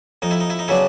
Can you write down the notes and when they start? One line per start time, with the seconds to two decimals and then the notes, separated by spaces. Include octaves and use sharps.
0.22 F2 D#4
0.31 E4
0.40 D#4
0.50 E4
0.59 D#4
0.68 C#3 F#3 B3 D4 E4